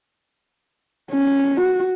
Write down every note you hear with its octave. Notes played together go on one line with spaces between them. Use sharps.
C#4
F#4